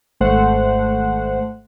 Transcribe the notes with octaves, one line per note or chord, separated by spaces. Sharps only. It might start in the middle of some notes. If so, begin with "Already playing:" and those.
G#1 A3 C5 F#5